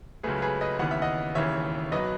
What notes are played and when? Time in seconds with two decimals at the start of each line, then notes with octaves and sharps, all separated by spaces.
0.23 C#2 C#3 F#3 A3 G#4 B4
0.42 G#4 B4
0.61 B4 D#5
0.79 D#2 C#3 E3 B3 F#5
0.91 E5
1.02 D#5 F#5
1.35 E1 D#2 C#3 E3 C#5 E5
1.92 B1 B2 F#3 B4 D#5